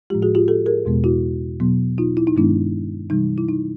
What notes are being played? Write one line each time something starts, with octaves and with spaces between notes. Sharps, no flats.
A2 F3 G#3 F4 G4
F#4 G#4
F4 G4
G4 A4
G#4 A#4
E2 B2 G#3 B3
E4 F#4
B2 F#3 B3
D#4 F4
E4
D#4
G2 D#3 G#3 B3 D4 E4
C3 E3 G3 D#4
E4
D#4